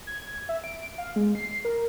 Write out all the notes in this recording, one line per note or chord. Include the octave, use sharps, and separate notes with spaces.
G#6
E5
D7
F5
G#3
C7
A#4